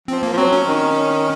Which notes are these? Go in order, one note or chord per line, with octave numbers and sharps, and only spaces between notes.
F3 C4
A#3
F3
F#3 C4
C#4
D#3